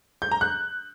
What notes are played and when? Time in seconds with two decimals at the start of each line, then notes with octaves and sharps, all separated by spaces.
0.22 G6
0.31 A#5
0.41 F#6